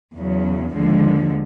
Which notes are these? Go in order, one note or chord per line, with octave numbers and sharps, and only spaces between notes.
E2 C#3 F#3
D#2 D3 F3 G#3